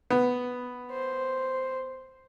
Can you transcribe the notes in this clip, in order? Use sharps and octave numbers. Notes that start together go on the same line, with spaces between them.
B3
C5